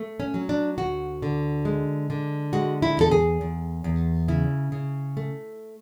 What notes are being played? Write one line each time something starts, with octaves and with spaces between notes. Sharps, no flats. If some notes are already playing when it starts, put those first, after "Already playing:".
Already playing: A3
C#4
F#3
D4
D2 F#4
D3
G#3
D3
G#3 F#4
E4
E2 A4
G#4
E2
E2
C#3 E4
C#3
A3